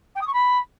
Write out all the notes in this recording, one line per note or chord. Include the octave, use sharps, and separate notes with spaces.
G5
D#6
C#6
B5